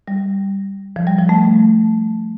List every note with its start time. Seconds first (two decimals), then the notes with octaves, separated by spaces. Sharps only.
0.08 G3
0.96 F3
1.07 G3
1.18 F3
1.29 A3